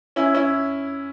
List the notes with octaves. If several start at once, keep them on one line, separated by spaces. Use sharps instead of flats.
C#4 E4
C#4 E4